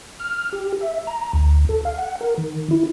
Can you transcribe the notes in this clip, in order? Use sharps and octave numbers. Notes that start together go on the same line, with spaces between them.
F6
G4
E5
A#5
D2
A4
F5
F#5
A#4
D#3
E4